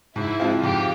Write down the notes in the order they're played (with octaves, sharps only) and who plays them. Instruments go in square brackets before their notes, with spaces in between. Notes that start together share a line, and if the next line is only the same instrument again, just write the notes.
[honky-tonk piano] G#2 [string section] E4
[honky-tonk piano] F3 G#3 C4 F4
[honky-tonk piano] G#2 [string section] G4